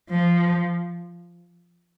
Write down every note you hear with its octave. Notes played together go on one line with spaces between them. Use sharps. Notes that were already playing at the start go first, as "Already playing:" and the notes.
F3